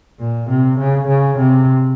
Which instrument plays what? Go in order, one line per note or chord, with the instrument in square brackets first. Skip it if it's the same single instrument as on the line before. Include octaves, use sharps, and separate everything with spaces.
[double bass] A#2
C3
C#3
C#3
C3